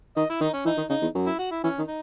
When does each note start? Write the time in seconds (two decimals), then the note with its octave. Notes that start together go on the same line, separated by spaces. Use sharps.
0.16 D#3 D#5
0.29 E4
0.40 D#3 D#4
0.53 C#4
0.65 E3 D#4
0.77 D#3
0.89 C#3 D#4
1.01 E2
1.15 F#2
1.27 E4
1.38 F#4
1.51 E4
1.63 E3 C#4
1.79 D#3
1.87 D#4